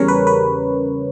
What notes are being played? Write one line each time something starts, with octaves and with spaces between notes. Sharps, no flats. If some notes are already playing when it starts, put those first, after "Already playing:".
Already playing: E2 C#3 G3 C#4 A#4 C#5
B4
B4